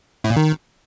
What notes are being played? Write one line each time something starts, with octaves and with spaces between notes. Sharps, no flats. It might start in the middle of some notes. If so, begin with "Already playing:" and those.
A2
A#2
D#3